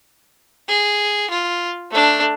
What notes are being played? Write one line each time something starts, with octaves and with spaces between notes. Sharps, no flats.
G#4
F4
A3 D4